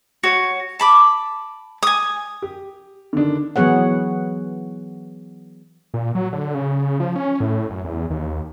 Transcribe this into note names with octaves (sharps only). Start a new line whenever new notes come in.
F#4 C#5
A5 B5 D6
G#5 D#6
G4
D3 D#3 D4
E3 F#3 B3 G#4 C#5 F#5
A#2
F#3
D3
C#3
F3
C#4
A2
F#2
E2
D#2